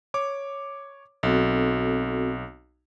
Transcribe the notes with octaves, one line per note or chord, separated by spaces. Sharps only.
C#5 D6
B1 C4 F#4 A4